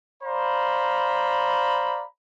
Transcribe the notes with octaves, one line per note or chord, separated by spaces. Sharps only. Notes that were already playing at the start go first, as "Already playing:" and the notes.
C5 D5 F5 A#5 B5